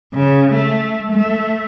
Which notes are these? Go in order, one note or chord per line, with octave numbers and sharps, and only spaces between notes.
C#3
A3
A3